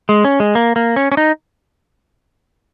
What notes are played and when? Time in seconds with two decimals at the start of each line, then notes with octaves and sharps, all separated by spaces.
0.09 G#3
0.24 C#4
0.40 G#3
0.55 A#3
0.76 A#3
0.96 C#4
1.12 C#4
1.17 D#4